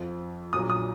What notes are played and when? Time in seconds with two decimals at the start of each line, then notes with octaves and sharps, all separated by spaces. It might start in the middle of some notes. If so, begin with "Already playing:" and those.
Already playing: F2 F3
0.53 A#1 A#2 F#3 D#6
0.70 D#6